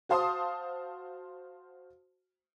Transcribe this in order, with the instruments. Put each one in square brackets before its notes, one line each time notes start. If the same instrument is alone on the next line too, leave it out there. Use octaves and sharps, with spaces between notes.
[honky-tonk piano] F#4 C5 F5 A5 C6 D#6